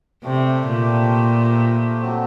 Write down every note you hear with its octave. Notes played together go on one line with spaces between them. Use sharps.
C3 A3 D4 G4 C5
A#2
F#3 A3 C4